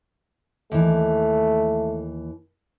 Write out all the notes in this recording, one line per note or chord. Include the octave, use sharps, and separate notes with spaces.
D#2 E3 A3